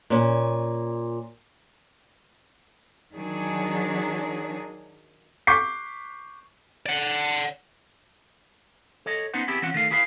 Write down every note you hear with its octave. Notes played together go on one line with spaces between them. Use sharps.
A#2 C#4
D#3 F#3 D4 G#4
C#6 D6 G6 B6 C7
D5 F#5
A4 C#5 D#5
B3 C#4 D#4 B4 C5 F#5
B3 C4 E4 G4 G#4
E3 C4 C#4 F4 F#5
D#3 A3 F5
E4 G#4 B4 D#5 F5